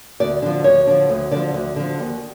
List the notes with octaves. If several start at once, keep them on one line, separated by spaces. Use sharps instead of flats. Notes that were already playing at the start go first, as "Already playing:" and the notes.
D2 D5
D3 F3
D2 C#5
D3 F3
D2
D3 F3 D5
D2
D3 F3
D#2